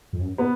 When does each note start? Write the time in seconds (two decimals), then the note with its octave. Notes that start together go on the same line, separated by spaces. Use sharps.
0.13 F2
0.21 F#2
0.38 B3